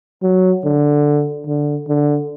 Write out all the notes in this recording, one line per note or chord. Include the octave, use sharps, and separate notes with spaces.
F#3
D3
D3
D3